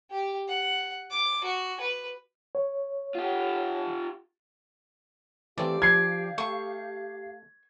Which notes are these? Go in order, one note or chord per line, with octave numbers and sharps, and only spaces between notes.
G4
F#5
D6
F#4
B4
C#5
F4 G4
E3 A3 C4 G4 D5 F5
F3 G#6 C7
A3 C#6